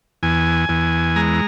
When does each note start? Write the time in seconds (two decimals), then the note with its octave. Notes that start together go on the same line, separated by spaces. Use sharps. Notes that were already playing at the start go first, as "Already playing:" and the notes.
0.23 E2 G#5
0.69 E2
1.16 G#3 A#5